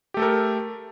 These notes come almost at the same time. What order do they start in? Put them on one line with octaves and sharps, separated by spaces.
G4 A3 A4 A#4